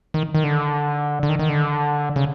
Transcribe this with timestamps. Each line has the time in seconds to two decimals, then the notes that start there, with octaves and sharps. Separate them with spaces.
0.14 D#3
0.35 D#3
0.44 D3
1.23 D3
1.29 D#3
1.39 D#3
1.49 D3
2.16 C#3